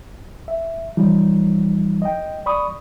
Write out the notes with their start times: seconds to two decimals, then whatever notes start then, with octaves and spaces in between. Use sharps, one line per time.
0.48 E5
0.97 E3 F3 G3 D#4
2.02 D#5 G5
2.46 D5 B5 C#6 D#6